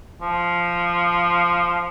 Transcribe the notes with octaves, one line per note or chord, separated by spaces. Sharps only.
F3